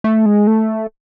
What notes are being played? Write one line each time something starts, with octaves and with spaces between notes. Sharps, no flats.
A3
G#3
A3